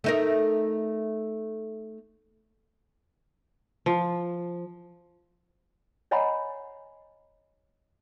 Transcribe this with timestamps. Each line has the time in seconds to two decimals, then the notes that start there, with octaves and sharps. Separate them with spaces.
0.04 A3 D#4 A#4
3.86 F3
6.11 C#5 D#5 F#5 G#5 A#5 B5